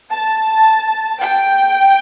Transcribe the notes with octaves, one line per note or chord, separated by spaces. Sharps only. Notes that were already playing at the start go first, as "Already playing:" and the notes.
A5
G5